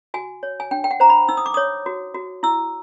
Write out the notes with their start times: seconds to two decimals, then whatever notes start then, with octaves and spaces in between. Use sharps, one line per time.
0.14 F#4 G#5
0.43 C#5
0.60 G#5
0.71 D4 G5
0.84 G5
0.91 F#5
1.00 C5 A#5
1.10 B5
1.29 D#4 E6
1.37 D#6
1.46 D6
1.54 C#5 D#6
1.86 F#4
2.15 F#4
2.43 E4 E6